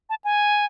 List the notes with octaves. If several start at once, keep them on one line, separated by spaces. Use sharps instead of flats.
A5
G#5